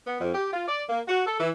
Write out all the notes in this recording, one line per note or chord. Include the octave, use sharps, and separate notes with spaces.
B3
F2
G4
F4
D5
A#3
F#4
A4
E3